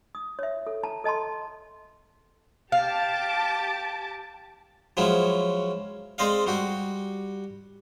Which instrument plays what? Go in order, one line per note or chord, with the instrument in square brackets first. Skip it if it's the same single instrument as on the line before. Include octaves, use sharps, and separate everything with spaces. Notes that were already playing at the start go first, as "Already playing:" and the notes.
[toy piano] D#6
C#5 E5
A4
A5 A#5
A4 D#5 A5 A#5 C6
[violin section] G4 A5 D6 [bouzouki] F5
[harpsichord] F3 F#3 G#3 C#4 E4
G#3 C4 C5 D5 D#5 F5
G3 F#4 G4